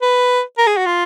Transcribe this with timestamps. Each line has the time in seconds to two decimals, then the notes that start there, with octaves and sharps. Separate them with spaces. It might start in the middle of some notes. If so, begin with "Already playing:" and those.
0.02 B4
0.58 A#4
0.67 G#4
0.77 F#4
0.86 F4